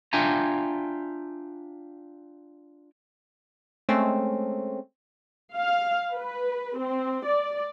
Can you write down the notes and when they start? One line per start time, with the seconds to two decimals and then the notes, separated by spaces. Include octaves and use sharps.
0.13 D4 F4 E5 G5 G#5 A#5
3.89 G#3 A3 C4 C#4
5.56 F5
6.13 B4
6.77 C4
7.24 D5